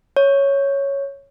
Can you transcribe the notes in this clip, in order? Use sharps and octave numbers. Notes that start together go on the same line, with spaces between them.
C#5